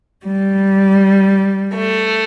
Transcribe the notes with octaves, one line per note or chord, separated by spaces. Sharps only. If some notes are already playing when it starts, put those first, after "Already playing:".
G3
A3